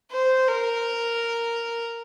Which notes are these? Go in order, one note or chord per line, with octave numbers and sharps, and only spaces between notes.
C5
A#4